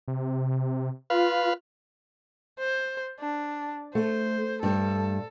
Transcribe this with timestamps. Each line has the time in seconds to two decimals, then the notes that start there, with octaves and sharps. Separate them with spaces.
0.08 C3
1.10 F4 B4 F5
2.59 C5
3.20 D4
3.95 A3 C5
4.63 G2 A3 A4